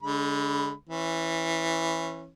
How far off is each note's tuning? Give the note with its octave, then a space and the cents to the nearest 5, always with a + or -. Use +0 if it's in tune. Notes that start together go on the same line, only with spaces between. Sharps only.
D3 -30 G#3 +0 B5 +0
E3 +0 C#4 -25